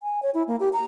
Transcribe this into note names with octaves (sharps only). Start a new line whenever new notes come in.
G#5
C#5
E4
A#3
G4
A#5